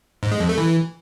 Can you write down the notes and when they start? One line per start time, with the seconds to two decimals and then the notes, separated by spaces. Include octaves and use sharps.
0.23 G#2
0.31 G#3
0.40 F2
0.49 A3
0.58 E3